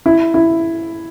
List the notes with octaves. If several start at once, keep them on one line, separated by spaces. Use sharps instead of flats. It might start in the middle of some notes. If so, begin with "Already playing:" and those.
E4
E4